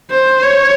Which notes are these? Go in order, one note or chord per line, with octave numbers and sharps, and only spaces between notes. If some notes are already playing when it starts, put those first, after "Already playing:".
C5
C#5